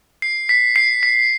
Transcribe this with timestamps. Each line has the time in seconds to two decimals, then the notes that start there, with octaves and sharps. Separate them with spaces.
0.22 C7
0.49 B6
0.76 C7
1.03 B6